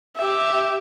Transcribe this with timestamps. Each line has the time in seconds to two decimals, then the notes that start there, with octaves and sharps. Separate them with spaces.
0.17 G4 E5